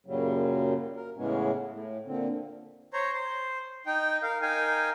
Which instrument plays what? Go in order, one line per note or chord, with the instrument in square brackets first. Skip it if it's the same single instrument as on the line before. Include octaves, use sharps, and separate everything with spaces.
[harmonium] F#2 A#2 C#3 F#3 G3
A#4
A2 C#3 E3 G#3 B3 C#4
A2
A#2 D3 C4
[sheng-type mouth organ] C5 C#5 A#5
C5
D#4 G5
A#4 F5
D#4 A#4 F5 G5 G#5